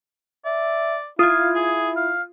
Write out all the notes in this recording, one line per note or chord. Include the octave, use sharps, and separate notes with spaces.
D5 E5
E4 F4 F5 D#6 G#6
G#4
F5